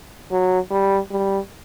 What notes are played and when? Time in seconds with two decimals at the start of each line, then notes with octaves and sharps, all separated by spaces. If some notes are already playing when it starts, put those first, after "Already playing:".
0.31 F#3
0.71 G3
1.11 G3